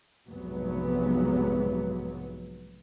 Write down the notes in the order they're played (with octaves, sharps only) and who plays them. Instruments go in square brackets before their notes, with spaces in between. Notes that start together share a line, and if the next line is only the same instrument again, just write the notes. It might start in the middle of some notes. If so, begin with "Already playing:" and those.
[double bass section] F1 B1 G#2 F#3 B3